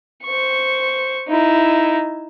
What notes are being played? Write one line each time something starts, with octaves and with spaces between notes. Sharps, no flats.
C5 C#6
D#4 E4